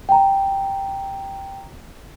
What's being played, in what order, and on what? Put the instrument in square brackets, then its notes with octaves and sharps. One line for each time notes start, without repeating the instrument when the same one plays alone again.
[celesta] G5 A#5